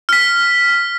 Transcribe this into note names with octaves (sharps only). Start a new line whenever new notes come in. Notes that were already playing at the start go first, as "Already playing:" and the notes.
F6 B6